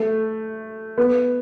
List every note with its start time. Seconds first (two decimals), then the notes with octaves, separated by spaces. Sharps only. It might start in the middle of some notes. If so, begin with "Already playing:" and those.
Already playing: A3
0.98 B3